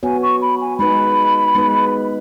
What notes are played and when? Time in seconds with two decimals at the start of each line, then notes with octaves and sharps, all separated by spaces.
0.03 B3 F#4 C#5 G#5
0.22 C#6
0.41 B5
0.60 G#5
0.78 G#3 D#4 B4 B5
1.55 G#3 B3 D#4 B4